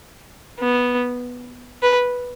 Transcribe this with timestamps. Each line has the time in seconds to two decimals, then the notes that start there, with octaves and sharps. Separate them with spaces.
0.60 B3
1.82 B4